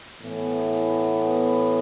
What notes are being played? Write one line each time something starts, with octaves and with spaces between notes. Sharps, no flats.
A2 E3 B3